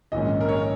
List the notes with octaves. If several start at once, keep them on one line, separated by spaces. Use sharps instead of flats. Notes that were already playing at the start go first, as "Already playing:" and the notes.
A#1 G#2 D#3 G#3 C#4 D#5
A#4
C#5
A#4